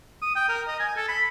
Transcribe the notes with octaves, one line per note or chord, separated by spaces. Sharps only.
D#6
G5
A#4
D#5
G#5
A4
B5